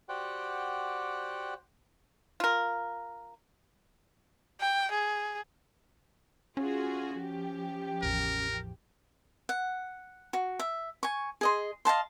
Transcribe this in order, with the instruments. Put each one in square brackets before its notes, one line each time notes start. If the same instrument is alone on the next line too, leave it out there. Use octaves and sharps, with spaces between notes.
[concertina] F#4 G4 C5 D5 F#5 G5
[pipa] F4 A#4
[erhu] G5
G#4
[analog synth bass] C#4 [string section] F4 F#4 G#4
[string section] F3 G4
[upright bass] A1 E2 [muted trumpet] A#4
[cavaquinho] F#5
F#4
E5
G#5 C#6
G#4 D#5 C6
D#5 F5 A5 C6